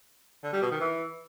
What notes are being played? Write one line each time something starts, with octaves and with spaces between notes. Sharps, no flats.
D3
G3
B2
D#3
E3